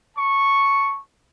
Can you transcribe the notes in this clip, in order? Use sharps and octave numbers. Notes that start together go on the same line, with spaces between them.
A5 C#6